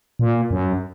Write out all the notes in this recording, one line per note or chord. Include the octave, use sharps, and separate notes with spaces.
A#2
F#2